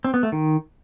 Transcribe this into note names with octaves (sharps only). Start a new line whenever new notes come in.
C4
B3
A3
D#3